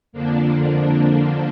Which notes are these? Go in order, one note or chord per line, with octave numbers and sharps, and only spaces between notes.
F2 D3 F3 A#3 D4